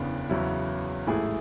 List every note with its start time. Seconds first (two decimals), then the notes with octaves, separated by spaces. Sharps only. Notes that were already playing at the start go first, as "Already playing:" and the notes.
Already playing: F#1 E2 C#3 E3 B3 D4
0.29 E2 C#3 F#3 B3 E4
1.07 A1 G#2 E3 A3 E4 G#4